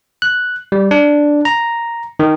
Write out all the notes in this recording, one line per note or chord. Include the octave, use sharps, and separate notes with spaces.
F#6
G3
D4
A#5
D#3